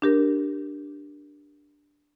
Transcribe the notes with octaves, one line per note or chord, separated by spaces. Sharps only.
D4 G4 A#4